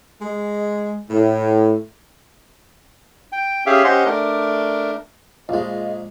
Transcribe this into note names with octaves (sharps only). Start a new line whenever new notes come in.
G#3
A2
G5
C#4 G4 G#4 E5 F5
C#4 G4 C5 D#5 F#5 C6
A3 D4 A#4
A#1 G#3 F4 G#4 D#5